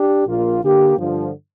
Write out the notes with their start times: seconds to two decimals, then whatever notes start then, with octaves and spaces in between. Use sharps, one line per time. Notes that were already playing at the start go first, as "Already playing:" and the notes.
Already playing: D4 G4
0.26 A#1 A#2 A#3 F4
0.61 D3 A#3 G4
0.96 G2 D3 F3